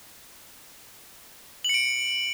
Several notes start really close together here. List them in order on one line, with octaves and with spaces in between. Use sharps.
F#7 C#7 D7